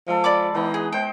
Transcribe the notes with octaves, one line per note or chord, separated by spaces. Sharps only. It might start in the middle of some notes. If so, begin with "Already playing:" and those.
F3 G#3 A4
D5 B5 D6
E3 G#3 B3 D#4
G#4
G#3 C5 G5